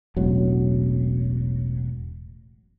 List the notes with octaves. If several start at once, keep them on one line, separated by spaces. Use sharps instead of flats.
E1 A1 F#3